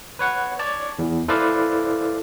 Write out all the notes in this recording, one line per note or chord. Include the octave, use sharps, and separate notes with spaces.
B4 C#5 F#5
C#5 D5 A5
E2
E4 A4 B4 C5 D5 F5